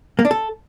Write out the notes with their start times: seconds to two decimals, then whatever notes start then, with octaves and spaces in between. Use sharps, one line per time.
0.19 A#3
0.25 D4
0.31 A4